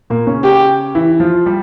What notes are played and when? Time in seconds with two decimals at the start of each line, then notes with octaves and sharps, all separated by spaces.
0.10 A#2 A#3
0.27 C#3 C#4
0.44 G4
0.95 E3 E4
1.20 F3 F4
1.46 G3 G4